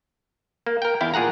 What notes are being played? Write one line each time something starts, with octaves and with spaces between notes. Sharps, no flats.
A#3
A#4 G5
E2 E4 F5 G5
A#2 G#4 F#5 A#5